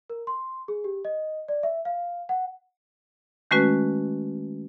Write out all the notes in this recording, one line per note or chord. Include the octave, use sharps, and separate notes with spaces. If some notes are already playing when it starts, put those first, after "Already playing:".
A#4
C6
G#4
G4
D#5
D5
E5
F5
F#5
D#3 G#3 A3 C#4 F#4 B4